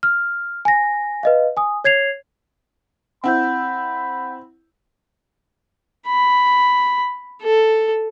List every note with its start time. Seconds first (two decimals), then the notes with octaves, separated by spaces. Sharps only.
0.03 F6
0.65 G#5 A#6
1.23 B4 D#5 F5
1.57 G#5 D#6
1.84 C#5 G#6 C7 F7
3.24 C4 E4 F#5 B5 G6
6.07 B5
7.43 A4